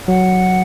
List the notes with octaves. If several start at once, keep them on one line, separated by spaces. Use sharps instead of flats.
F#3 F#5